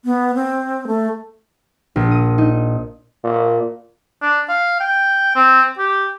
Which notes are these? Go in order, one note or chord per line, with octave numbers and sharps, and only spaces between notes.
B3
C4
A3
A#1
D#6
D#4
A#2
D4
F5
G5
C4
G4